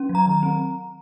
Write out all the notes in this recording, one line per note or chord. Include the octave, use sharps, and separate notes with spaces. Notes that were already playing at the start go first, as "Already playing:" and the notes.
Already playing: C#4
F#3
A#5
D#3 A#5
C4